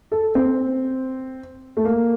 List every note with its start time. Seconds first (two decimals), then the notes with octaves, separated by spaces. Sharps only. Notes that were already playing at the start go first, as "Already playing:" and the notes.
0.12 A4
0.35 C4
1.77 A3
1.85 A#3